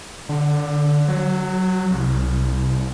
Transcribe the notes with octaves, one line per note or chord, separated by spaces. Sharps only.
D3
F#3
C2